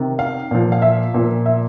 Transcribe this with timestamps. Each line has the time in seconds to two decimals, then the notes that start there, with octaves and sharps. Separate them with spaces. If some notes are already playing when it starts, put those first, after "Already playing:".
Already playing: C3 D#3
0.19 F5
0.51 A#2 F3
0.72 F5
0.82 E5
1.14 A#2 F3
1.46 E5